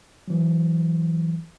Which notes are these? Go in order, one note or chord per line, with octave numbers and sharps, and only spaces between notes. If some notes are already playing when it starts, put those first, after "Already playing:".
E3 F#3